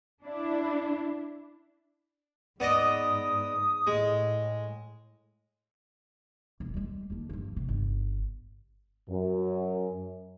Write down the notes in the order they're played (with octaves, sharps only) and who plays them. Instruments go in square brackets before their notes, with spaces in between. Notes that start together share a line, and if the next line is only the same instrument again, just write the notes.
[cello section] D4 E4
[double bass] G#2 [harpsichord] B3 D5 D#5 [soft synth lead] D#6
[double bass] A2 [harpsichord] G#3
[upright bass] E1
G3 G#3
D#2 D3
G2 F3
C3
G1
[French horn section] F#2